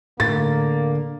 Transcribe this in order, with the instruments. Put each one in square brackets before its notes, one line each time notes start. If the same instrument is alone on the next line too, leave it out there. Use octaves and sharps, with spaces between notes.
[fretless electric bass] A2 [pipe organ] D3 [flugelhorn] A#3 [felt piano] A6